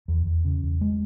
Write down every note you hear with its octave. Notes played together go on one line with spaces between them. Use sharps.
E2
E2
C#3
E2
G#3